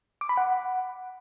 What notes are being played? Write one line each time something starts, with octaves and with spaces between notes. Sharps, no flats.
D6
B5
F#5